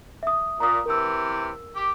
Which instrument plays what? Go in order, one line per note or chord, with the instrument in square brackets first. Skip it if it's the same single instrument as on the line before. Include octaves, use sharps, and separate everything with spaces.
[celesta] E5 D#6
[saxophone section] A#2 [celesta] A#5 D#6
[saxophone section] C3 E3 [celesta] A#4 E6
[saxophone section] G4